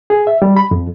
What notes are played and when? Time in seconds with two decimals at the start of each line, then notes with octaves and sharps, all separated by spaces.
0.10 G#4
0.27 E5
0.42 G3
0.57 B5
0.71 F2